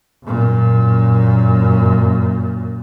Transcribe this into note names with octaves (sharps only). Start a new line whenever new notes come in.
F#2 A#2